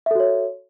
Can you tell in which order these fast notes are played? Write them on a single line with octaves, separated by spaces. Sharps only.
E5 A4 F#4 C#5